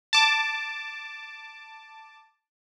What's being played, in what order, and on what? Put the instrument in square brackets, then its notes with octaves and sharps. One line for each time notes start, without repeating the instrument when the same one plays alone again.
[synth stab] A5 D6